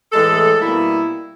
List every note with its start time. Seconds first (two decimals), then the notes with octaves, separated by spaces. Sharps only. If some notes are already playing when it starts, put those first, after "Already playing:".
0.12 A2 E3 G#3 A4
0.61 B2 G3 A#3 E4